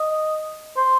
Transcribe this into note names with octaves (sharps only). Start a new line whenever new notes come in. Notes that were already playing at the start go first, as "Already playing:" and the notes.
Already playing: D#5
C5